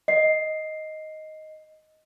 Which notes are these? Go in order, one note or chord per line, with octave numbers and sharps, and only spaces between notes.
D#5 C7